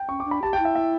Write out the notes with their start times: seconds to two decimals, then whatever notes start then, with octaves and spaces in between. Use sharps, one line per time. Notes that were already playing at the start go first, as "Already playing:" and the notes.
Already playing: G5
0.09 C#4 C#6
0.20 D4 D6
0.31 B5
0.42 G4 A5
0.53 G5
0.59 E4
0.65 E5
0.75 E5